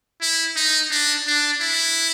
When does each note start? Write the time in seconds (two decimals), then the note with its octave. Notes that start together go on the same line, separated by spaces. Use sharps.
0.22 E4
0.56 D#4
0.91 D4
1.27 D4
1.61 E4